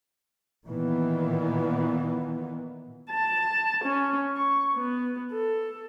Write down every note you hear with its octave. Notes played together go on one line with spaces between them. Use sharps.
A#2 D#3 E3 B3
A5
C#4
C#6
B3
A4